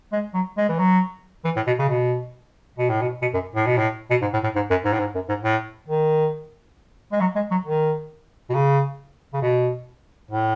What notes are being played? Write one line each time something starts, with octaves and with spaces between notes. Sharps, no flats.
G#3
F#3
G#3
E3
F#3
E3
A2
B2
C#3
B2
B2
A2
B2
B2
F#2
A2
B2
A2
B2
G#2
A2
A2
G#2
F#2
G#2
A2
G#2
F#2
G#2
A2
D#3
G#3
F#3
G#3
F#3
D#3
B2
C#3
C#3
B2
A2